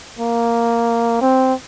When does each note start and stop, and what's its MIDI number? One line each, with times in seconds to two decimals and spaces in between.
0.19 1.18 58
1.21 1.53 60